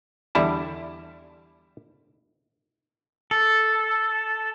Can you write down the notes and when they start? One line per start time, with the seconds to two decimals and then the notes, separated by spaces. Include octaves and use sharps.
0.35 E2 D3 G3 E4 A5
3.31 A4